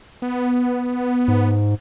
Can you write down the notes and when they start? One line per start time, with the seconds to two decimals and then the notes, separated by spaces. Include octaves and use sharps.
0.22 B3
1.28 G#2